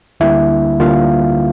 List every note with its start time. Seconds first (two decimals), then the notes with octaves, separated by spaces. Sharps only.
0.20 D2 D3 G3 A#3 E4 E5
0.80 D2 D3 G3 A#3 F4 F5